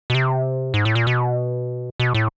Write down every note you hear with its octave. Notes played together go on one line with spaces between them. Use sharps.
B2
C3
G#2
A2
A#2
B2
B2
A2